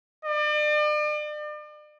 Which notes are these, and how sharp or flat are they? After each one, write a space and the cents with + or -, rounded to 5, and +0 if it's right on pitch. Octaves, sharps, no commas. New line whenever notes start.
D5 +40